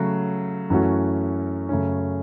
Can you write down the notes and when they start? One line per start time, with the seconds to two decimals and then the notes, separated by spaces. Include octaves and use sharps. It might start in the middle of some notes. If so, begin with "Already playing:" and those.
Already playing: C#3 F#3 A3
0.70 F#2 E3 A3 C#4 F#4
1.69 F#2 C#3 A3 C#4